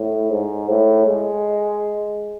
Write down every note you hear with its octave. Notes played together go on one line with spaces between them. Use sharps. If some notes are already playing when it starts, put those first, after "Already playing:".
Already playing: A2
G#2
A2
G#3